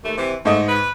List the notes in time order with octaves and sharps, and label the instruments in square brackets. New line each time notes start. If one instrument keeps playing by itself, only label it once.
[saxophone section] D#2 A3
C3 E3
[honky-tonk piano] G#2 D#5 [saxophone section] A3
[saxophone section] B4